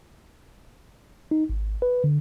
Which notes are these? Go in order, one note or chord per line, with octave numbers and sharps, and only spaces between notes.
D#4
G#1
B4
D3